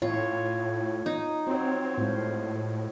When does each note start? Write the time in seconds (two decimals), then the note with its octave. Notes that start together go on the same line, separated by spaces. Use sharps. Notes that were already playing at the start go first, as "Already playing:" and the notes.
0.02 A2 F4 C#5
1.06 D#4
1.47 C4 F4 F#4 C#5
1.98 A2 G#3 F4 C5